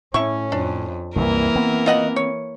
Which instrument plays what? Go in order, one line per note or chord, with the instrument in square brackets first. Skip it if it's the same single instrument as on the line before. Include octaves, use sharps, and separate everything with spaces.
[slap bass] A2 [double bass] C#4 [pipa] E4 C#6
[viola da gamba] F2 [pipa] D4
[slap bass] C2 F#2 C3 [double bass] E3 [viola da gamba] A#3 A#4
[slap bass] B3 C4
[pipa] F4 D#5 F#5
C#5